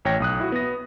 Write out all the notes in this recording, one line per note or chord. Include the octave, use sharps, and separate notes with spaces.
A1 C#5 G5 A#6
B1 D#6 F#6
E4 F#4
B3 A#6